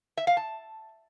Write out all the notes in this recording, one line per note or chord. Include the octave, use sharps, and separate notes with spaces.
E5
F5
A5